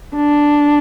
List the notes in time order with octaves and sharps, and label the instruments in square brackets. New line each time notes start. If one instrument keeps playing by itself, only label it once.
[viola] D4